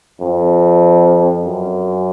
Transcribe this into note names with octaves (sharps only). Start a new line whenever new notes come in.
F2
F#2